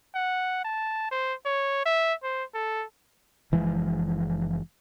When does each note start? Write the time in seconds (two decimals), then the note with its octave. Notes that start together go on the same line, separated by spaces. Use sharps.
0.15 F#5
0.64 A5
1.11 C5
1.45 C#5
1.85 E5
2.23 C5
2.54 A4
3.52 F#1 E3 F3 G#3